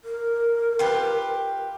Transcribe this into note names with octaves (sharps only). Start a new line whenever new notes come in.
A#4
F4 G4 B4